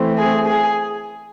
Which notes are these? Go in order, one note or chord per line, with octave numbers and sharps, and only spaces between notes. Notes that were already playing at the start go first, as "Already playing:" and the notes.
Already playing: E3 A3 C4
G#4
G#4